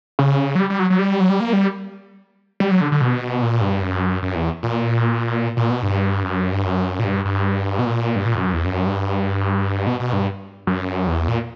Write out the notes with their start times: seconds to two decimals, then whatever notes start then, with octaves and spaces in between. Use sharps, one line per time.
0.19 C#3
0.55 F#3
0.60 G3
0.70 G3
0.79 F#3
0.90 F#3
0.99 G3
1.20 F#3
1.30 G3
1.40 A#3
1.53 G3
2.60 G3
2.71 F#3
2.81 D3
2.92 D3
3.01 B2
3.42 A#2
3.61 G2
3.82 F#2
4.22 F#2
4.35 E2
4.63 A#2
5.57 A#2
5.70 B2
5.83 G2
6.23 F#2
6.52 G2
6.65 F#2
6.99 A#2
7.04 G2
7.25 G2
7.79 B2
7.86 A#2
8.16 G2
8.25 A#2
8.35 E2
8.38 F#2
8.53 E2
8.65 F#2
8.86 G2
9.87 B2
10.00 B2
10.13 G2
10.67 F#2
11.07 E2
11.28 A#2